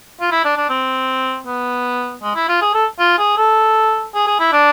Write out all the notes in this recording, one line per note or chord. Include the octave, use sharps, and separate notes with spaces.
F4
E4
D4
D4
C4
B3
G#3
E4
F4
G#4
A4
F4
G#4
A4
G#4
G#4
E4
D4